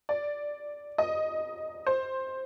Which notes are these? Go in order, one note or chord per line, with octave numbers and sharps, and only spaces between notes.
D5
D#5
C5